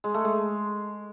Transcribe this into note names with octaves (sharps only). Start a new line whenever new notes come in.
G#3
A3
G#3